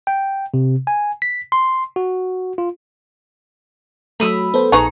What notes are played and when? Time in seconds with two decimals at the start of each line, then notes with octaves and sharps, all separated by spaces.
0.07 G5
0.54 C3
0.87 G#5
1.22 B6
1.52 C6
1.96 F#4
2.58 F4
4.20 F#3 A3 B5 D#6 E6
4.54 B3 A4 C5
4.72 A#1 D#4 G#4 B4 G#5 A#5 C#6